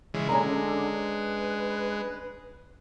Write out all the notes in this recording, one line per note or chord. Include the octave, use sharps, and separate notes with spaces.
C#3 E3 G#3
D3 G#3 C#4 D4 A#5
B4